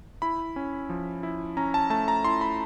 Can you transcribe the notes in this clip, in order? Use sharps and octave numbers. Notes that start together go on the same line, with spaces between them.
E4 B5
C#4
F3
E4
C#4 A#5
A5
A3 A5
A#5
E4 C6
B5